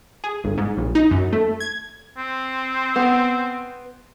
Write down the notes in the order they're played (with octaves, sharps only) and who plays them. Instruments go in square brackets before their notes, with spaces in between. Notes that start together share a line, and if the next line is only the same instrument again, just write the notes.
[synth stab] G#4
G1
G#2
A#1
D#4
F#2
A3
G#6
[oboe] C4
[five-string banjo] B3